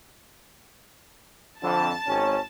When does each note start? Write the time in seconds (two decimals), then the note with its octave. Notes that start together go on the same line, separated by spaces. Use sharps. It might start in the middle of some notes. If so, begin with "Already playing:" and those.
1.62 F2 D3 A5
2.06 G#1 C#4